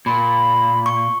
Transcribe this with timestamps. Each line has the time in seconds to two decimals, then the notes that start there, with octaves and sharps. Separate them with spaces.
0.06 A#2 B5
0.86 C#6